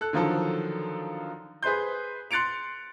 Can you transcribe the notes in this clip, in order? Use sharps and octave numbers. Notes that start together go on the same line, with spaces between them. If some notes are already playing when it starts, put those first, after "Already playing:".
A4 F#6
D3 D#3 F3 F#3 A4
G#4 B4 C5 C6 G6
C6 F#6 A6 C#7 D7 F7